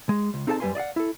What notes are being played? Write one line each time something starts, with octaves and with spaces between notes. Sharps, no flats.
G#3
C#2
C4 D#4 G#4 A4 F5 A5
F#2 G3 A#4 B4 G#5 C6
D5 D#5 F5 F#5
E4 A4